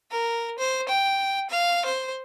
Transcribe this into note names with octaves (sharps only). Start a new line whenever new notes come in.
A#4
C5
G5
F5
C5